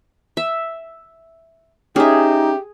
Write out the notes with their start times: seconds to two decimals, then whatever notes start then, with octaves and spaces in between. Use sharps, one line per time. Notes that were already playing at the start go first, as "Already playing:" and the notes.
0.37 E5
1.96 C#4 D#4 G4 G#4 E5